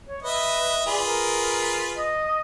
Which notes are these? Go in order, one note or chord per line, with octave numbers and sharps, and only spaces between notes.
C#5
B4 D#5 E5
F4 G#4 B4 D5
A#4
D#5